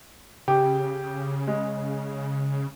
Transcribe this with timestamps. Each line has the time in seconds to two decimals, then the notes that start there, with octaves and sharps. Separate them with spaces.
0.48 C#3 G4
1.47 G#3